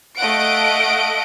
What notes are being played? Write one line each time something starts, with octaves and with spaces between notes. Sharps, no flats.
A3 D#5 F5 F#5 D7